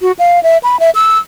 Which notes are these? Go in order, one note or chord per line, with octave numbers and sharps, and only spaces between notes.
F#4
F5
E5
B5
E5
E6